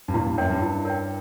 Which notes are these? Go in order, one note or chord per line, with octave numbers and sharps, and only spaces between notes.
G2
A#2 E4
G2
F#2 A#4 C#5 G5
G2
E4
A#4 C#5 G5